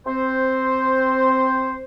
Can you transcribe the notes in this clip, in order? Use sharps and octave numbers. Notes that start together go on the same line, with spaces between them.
C4 C5